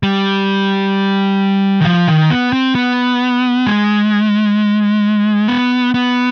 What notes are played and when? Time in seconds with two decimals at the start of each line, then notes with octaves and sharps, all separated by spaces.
0.03 G3
1.81 D#3
1.85 F3
2.08 D#3
2.30 B3
2.53 C4
2.75 B3
3.67 G#3
5.48 B3
5.94 B3